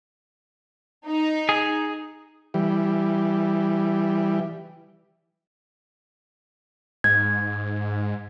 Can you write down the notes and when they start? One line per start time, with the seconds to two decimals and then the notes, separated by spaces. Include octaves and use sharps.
1.07 D#4
1.49 G#4
2.54 E3 G3
7.04 G#2 G#6